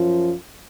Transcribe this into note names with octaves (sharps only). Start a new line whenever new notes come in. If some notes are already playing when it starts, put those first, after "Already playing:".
Already playing: F#2 F3